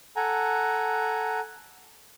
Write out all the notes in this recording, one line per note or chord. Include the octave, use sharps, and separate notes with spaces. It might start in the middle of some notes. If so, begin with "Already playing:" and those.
A4 F#5 G#5 A#5